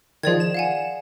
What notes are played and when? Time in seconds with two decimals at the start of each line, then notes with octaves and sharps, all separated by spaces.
0.23 D#3 F3 G#4 D5 G#6
0.40 E7
0.54 F5 F#5 G#5